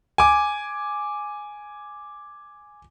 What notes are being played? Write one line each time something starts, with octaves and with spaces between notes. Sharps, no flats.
G#5 D6